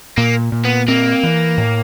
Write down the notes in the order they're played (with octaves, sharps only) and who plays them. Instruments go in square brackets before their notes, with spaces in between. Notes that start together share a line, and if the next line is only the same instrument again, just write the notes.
[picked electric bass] A#2 [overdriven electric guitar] A#3
[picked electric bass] A#2
[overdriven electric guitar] B3
[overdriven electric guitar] A#3 [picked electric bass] C4
[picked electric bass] E3
A2